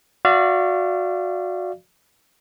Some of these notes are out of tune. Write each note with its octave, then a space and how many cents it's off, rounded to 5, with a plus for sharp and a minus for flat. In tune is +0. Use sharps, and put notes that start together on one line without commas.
F#4 -20 D5 +0 F5 -40